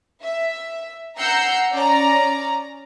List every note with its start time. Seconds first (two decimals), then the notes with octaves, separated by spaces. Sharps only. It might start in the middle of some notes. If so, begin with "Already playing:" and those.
0.24 E5
1.18 F#5 A#5 E6 G6 C7 C#7
1.73 C#4 D5 A#5